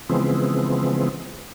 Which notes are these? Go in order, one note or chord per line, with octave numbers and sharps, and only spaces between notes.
C#3 E3 F3 G#3 B3 C4